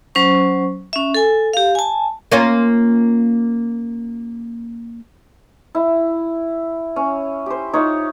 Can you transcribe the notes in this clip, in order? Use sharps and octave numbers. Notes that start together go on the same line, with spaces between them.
F#3 C#4 C5 C#6
C#4 E5
A4 G#5
G4 F5
G#5 A5
A#3 C#4 F4
E4
C#4
G4 C5
D#4 F4 C#5